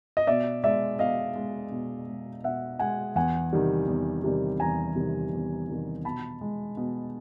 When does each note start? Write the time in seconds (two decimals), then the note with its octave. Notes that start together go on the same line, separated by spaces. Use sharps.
0.17 D#5
0.27 B2 D5 E5
0.64 G#3 D5 E5
0.99 B2 D#5 F5
1.36 G#3
1.72 B2
2.07 G#3
2.44 B2 E5 F#5
2.79 G#3 F#5 G#5
3.16 E2 F#5 G#5
3.53 C3 D#3 G3
3.88 E2
4.24 C3 D#3 G3
4.60 E2 G#5 A#5
4.96 C3 D#3 G3
5.33 E2
5.69 C3 D#3 G3
6.05 B2 A5 B5
6.41 G#3
6.77 B2